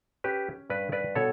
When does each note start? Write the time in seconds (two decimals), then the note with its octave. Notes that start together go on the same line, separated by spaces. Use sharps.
0.24 C#4 G4 B4
0.70 G2 B4 D5
0.92 B4 D5
1.15 B2 A4 C#5